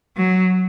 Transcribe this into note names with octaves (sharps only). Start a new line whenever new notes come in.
F#3